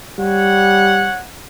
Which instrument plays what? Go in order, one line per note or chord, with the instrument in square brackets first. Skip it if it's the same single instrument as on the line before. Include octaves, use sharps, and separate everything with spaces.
[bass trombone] G3 [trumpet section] C#5 F#5